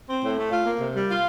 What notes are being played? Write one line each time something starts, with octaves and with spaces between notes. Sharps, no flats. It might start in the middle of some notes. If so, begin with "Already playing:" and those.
C4
A2
A3
F4
A#3
C3
G3
F4